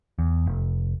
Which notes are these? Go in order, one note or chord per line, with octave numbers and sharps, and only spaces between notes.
E2
F1